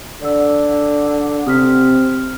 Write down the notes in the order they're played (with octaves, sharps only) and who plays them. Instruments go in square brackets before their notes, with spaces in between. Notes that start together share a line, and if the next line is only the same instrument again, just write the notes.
[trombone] D3 [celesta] D5 E6
[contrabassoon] C3 [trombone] C4 [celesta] D#6 F6 B6